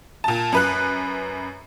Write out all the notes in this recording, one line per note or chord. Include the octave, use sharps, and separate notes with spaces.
A#2 A5
F#2 B4 F#6